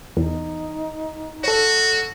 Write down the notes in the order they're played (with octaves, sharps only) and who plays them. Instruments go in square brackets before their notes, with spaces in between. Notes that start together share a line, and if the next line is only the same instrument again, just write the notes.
[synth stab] E2 [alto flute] D#4
[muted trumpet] F#4 [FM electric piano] A4 C#5